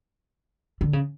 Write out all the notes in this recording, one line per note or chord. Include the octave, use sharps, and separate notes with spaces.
D3
C#3